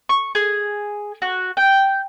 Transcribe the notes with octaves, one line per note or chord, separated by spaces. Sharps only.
C#6
G#4
F#4
G5